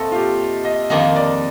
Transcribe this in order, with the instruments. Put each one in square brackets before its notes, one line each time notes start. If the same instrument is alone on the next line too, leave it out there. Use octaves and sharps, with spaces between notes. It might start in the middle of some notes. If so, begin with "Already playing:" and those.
Already playing: [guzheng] A#2 A3 C4 [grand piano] A4 D#5
[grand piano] F4
G4
D#5
[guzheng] F2 D#3 A#3 D4 [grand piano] D#5
[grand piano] D5